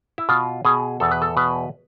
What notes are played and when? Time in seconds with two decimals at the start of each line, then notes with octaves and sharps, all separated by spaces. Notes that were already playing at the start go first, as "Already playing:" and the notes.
0.18 E4
0.29 B2 F4
0.65 B2 G#4
1.00 E2 A4
1.12 B4
1.22 A4
1.37 B2 B4